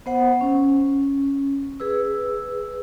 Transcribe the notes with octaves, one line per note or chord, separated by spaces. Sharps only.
B3 C5 F#5
C#4
G#4 B4 E6